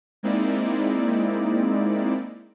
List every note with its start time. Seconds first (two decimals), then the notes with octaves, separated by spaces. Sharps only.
0.23 G#3 A#3 C4 D#4 E4 D5